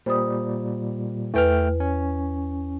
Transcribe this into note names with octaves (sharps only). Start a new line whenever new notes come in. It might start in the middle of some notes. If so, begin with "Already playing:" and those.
A#2 G3 C5 D#6
E2 A3 B4 G5 F6
C#4